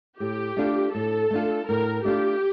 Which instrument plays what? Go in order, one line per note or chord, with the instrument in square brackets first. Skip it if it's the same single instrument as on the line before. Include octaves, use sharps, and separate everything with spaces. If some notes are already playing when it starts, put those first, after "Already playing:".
[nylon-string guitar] A2 [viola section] G4
[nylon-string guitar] A3 D4 F4
[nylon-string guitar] A2 [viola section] A4
[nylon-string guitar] A3 D4 F4
[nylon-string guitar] A2 [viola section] A#4
[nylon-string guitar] A3 D4 F4 [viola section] G4